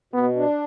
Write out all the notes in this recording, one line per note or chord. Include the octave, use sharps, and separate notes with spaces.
B2 B3
D4